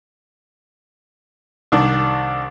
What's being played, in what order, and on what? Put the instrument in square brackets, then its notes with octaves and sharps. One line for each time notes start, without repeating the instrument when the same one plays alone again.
[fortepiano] C2 D#3 D4